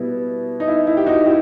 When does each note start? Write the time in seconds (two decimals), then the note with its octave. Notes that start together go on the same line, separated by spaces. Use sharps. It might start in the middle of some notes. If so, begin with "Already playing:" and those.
Already playing: B2 G3 B3 E4
0.60 D#4
0.68 E4
0.87 E4
0.97 G4
1.06 D#4 F#4
1.26 E4 G4